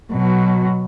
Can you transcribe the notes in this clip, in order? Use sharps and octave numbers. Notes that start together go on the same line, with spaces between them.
B2 F#3